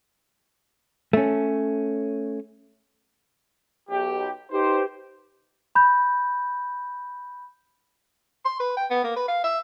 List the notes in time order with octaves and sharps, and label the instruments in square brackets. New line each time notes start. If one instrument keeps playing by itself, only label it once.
[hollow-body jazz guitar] A3 C#4
[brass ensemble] B1 G4
D#4 G4 B4 C5
[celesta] B5 G6
[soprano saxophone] C6
B4
G5
B3
A#3
B4
F5
E5